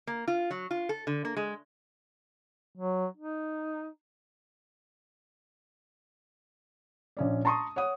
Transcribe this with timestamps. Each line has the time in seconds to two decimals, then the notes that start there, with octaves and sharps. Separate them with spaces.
0.07 A#3
0.28 F4
0.51 F#3
0.71 F4
0.89 A4
1.07 D3
1.25 A#3
1.37 G#3
2.75 F#3
3.17 D#4
7.17 A#1 C#4 D5
7.45 A5 A#5 C6 C#6 D#6
7.76 C#5 F#5 D#6